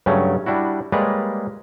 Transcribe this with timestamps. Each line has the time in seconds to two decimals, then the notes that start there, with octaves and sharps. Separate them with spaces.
0.06 G2 C#3 F#3 A3 C#4
0.46 G3 D4 E4 F#4
0.92 G3 G#3 A#3 B4 C#5 D5